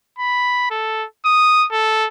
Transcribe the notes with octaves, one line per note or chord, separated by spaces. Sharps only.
B5
A4
D#6
A4